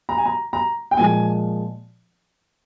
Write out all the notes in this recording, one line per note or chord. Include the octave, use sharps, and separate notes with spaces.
A#5
G#5
A#5
A#5
G5
A#2 F3 G#3 G#5